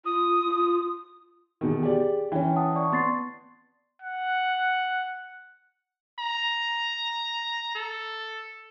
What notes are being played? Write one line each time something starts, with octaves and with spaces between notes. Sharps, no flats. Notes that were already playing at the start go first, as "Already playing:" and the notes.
F4 D#6
F4
E2 B2 D#3
G4 G#4 D5
E3 C#4 G5
F#5 A5 D#6
D5 C#6
B3 C6 A6 C7
F#5
A#5
A4